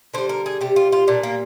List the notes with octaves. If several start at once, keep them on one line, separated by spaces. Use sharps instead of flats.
D3 G3 C5
A#4
G#4
C3 G3 G4
F4
F4
A#2 G3 D4
A#3